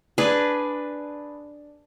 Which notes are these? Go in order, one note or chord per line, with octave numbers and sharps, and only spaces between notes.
D4 G#4 B4